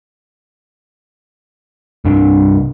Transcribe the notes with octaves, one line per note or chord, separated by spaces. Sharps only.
C2 G2 D4